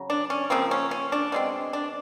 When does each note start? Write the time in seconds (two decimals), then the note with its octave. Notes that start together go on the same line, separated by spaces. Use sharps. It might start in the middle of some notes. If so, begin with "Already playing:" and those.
Already playing: C#3 F#3
0.10 D4
0.30 C#4
0.50 C#3 F3 A#3 C4
0.71 C#4
0.91 C#4
1.12 D4
1.32 B2 G#3 C4
1.73 D4